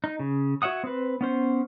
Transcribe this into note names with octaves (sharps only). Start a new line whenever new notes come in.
D#4
C#3
F#4 C#5 E5 F#5 D#6
C4 B4
B3 C#4 C5